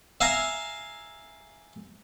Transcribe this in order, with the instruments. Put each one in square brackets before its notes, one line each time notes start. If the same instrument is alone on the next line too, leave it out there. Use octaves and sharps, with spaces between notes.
[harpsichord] E5 F5 G#5 A#5